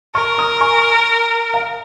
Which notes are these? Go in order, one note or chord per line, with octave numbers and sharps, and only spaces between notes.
A#4 C#6 F6
A#5 D#6
G#5 C#6
F5 A#5